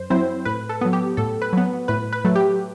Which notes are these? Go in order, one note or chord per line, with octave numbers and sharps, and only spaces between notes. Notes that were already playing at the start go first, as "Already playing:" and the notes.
Already playing: F#2 C5
F#3 C4 E4 C5
A2 B4
A4
F#3 B3
G4
A2 A4
B4
F#3 B3
A2 B4
B4
F#3 A3
G4